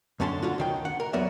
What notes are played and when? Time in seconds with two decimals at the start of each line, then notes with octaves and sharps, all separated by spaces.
0.20 F#2 D3 C#4 A5 C6
0.42 D3 F4 F#4
0.58 C#2 D#3 G5
0.85 F#5
1.00 A#4
1.13 E2 F#3 B3 A#4 D5 E5